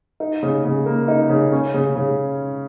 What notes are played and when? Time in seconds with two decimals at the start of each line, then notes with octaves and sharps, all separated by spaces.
0.20 D#4
0.43 C#3
0.65 C#3
0.86 A#3
1.08 D#4
1.29 C#3
1.52 C#4
1.74 C#3
1.95 C#3